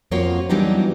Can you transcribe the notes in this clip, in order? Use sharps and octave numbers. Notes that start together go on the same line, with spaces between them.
F2 A#3 F4 F#4 C#5
E3 F#3 G3 B3 D4 D#4